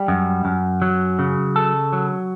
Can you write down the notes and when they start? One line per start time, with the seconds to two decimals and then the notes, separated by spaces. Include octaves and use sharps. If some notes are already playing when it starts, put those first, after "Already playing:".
Already playing: G3
0.08 F#2
0.45 F#2
0.82 F#3
1.19 C#3
1.56 A4
1.93 F#3